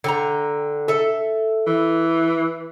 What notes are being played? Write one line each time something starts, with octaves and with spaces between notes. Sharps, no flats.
D3 G5 A#5
A4 E5
E3